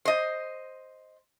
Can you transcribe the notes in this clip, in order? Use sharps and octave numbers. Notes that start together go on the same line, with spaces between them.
C5 D#5